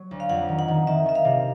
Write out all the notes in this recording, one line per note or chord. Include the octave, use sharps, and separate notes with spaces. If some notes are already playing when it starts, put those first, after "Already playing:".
Already playing: F#3
D2
F5
F2 F#5
D#3
F#5
D#3
D#3 E5
D#3 E5
F5
C3